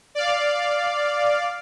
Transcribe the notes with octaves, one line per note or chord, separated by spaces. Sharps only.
D5 F5